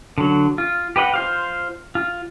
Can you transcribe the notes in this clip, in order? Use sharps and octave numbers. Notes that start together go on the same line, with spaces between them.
D3 F#3
F4
G4 B4 D#5 F#5
F4 C5 F5
F4